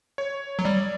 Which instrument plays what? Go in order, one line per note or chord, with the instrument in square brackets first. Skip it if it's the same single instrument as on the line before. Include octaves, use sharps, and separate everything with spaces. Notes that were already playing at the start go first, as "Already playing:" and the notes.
[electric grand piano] C#5
[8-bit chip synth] F#3
[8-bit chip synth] G3 [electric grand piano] D5